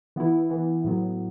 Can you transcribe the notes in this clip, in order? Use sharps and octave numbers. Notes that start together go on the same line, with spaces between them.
E3 B3 E4
E3 B3 E4
A2 F#3 B3